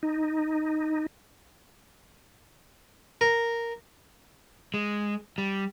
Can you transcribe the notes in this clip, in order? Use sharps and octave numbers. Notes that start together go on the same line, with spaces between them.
D#4
A#4
G#3
G3